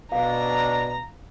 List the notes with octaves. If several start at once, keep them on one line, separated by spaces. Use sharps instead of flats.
B2 D4 F5 A#5